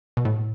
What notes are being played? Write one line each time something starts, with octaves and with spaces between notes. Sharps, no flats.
B2
A2